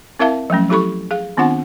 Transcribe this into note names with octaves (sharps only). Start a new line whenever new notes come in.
C4 E4 A#4 E5 F5 A5
F3 F#3 A3 C#4
F#3 E4 G4 A4 B5 C#6
G#4 F5
D#3 B3 C4 D4 F4 F#5